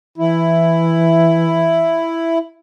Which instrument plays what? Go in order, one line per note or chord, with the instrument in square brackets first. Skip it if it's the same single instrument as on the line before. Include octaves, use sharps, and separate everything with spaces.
[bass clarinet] E3 [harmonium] E4